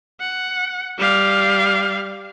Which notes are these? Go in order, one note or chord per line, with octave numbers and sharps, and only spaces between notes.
F#5
G3 F5